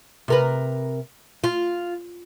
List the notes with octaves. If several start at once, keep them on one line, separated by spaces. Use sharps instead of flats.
C3 A#4 B4
F4